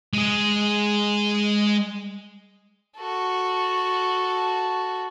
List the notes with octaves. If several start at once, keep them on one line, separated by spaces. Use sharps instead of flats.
G#3 G#4
F#4 A4